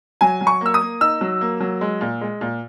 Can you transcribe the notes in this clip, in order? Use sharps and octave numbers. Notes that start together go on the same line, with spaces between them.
F#3 G#5
F#3
C#6
A#3 E6
D#6
A#3
D#4 E6
F#3
A#3
F#3
G#3
A#2
G#3
A#2